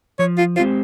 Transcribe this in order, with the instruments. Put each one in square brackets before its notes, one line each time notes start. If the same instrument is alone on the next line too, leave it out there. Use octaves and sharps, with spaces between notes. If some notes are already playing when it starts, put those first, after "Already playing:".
[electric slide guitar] F3 [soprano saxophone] C#5
[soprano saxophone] F4
[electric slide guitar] G#3 C4 G4 C5 [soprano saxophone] F4